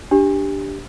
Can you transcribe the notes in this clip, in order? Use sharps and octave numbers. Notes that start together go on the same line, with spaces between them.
D4 G4